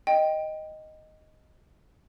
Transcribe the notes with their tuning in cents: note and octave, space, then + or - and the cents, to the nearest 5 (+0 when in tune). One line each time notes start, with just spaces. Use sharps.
D#5 +0 G5 +0